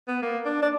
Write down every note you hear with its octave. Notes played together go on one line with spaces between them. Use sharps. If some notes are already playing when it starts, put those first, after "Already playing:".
B3
A#3
D4
D4